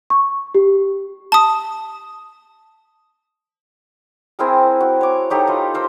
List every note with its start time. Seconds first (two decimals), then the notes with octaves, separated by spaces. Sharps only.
0.10 C#6
0.55 G4
1.32 A5 D#6
4.39 C4 E4 G#4 A#4
4.80 F#4
5.01 C#5 D6
5.30 F#3 D#4 G4 A4
5.47 F4 B4 D#5
5.74 A#4 C5 E6